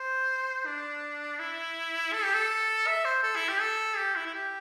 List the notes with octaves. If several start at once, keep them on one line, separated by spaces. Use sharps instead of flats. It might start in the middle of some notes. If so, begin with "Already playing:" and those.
Already playing: C5
D4
E4
A4
G4
A4
E5
C5
A4
E4
G4
A4
G4
E4
E4
G4